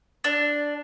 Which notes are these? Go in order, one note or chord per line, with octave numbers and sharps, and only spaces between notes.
D4